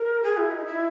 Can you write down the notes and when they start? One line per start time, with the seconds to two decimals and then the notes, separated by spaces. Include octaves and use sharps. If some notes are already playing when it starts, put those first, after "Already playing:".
Already playing: A#4
0.23 G#4
0.37 E4
0.51 D#4
0.66 E4